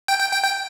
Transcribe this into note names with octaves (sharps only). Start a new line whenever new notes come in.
G5
G5
G5
G5